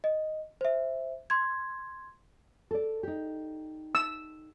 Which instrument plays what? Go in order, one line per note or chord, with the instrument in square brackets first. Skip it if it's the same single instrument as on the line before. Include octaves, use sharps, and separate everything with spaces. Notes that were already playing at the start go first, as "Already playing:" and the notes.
[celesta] D#5
C5 E5
C6 G#6
[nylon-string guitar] A4 D5
D#4 G4
[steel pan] E6